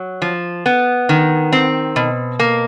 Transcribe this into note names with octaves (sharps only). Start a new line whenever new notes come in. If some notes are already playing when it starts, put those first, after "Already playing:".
Already playing: F#3
F3
B3
D#3
C4
B2
A#3